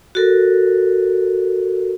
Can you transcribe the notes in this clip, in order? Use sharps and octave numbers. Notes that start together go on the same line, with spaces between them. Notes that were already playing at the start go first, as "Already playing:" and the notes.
F#4 A4 A#4